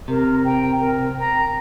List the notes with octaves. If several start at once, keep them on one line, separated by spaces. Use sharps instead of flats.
C3 A#4
G5 A#5
A#4
G5 A#5